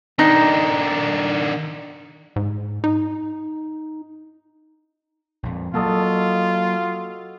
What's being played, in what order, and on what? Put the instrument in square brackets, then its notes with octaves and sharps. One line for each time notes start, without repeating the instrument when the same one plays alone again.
[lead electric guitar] D#3 D4 [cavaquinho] D#4
[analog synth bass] G#2
D#4
[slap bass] A#1 F2
[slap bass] F#3 A#3 [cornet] F4 [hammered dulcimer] F#4 A4 D#5